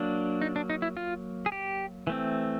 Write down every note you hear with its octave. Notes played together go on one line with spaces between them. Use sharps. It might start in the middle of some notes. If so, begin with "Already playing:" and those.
Already playing: F#3 A#3 D4
D#4
D4
D#4
E4
F4
G#4
G4
E3 A3 C4